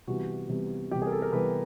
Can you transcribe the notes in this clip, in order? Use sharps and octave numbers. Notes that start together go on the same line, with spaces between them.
C3 E3 G3 B3 F#4
C3 E3 G3 B3
C3 E3 G3 B3 G4
G#4
A#4
A4
A#4
C3 E3 G3 B3 B4